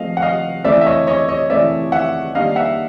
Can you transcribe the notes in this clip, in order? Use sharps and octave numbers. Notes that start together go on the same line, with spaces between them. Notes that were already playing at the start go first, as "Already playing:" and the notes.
Already playing: F3 A3 C4 D#5 F5
F#5
D#5 F5
E3 A3 C4 D5 E5
E5
C#5 D#5
C#5 D#5
C#5 D#5
E3 A3 C4 D5 E5
E5 F#5
D#3 G3 A#3 D4 D#5 F5
E5 F#5